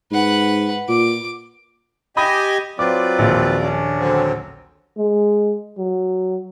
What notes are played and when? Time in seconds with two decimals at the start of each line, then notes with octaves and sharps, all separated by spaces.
0.11 G#2 B4 F#5
0.89 A#2 D6
2.17 G4 D#5 G#5 B5 D#6 A#6
2.79 F#3 C4 F4 B4 D5 D6
3.19 A#1 D#2
3.63 C#4 D4
3.98 D3 F#3 C4
4.97 G#3
5.78 F#3